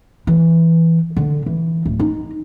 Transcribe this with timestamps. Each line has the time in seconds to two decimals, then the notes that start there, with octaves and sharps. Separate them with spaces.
0.27 E3
1.17 D3
1.46 E3
1.85 D1
2.00 D#4